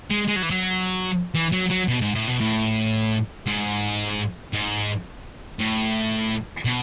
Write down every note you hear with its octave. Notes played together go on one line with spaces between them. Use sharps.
G#3
G#3
F#3
E3
F#3
E3
F#3
F#3
B2
G#2
A2
B2
A2
G#2
G#2
A2
B2